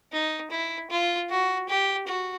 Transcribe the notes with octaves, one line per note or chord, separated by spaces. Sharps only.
D#4
E4
F4
F#4
G4
F#4